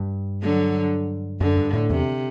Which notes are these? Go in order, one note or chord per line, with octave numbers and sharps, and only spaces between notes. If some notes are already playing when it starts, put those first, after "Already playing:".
Already playing: G2
D3 F#3
F#2 D3
G2
A2
E2 C3